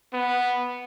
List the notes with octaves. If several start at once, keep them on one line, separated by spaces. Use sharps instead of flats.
B3